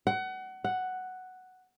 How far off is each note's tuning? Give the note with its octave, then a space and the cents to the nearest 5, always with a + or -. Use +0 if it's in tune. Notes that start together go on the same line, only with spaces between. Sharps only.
F#5 +25
F#5 +5